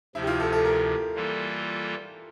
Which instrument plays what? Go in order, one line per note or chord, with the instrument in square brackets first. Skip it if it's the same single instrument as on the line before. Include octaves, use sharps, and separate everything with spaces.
[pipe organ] D2 C3 F3 [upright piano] E4
[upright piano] G4
F4
A4
A4
A#4
[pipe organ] E3 G3 A#3 F4 A4